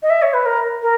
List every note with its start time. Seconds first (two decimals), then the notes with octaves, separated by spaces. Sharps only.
0.02 D#5
0.09 E5
0.22 C#5
0.33 B4
0.45 A#4
0.82 A#4